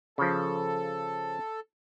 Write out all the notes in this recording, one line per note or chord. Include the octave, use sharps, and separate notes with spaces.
C#3 F3 A4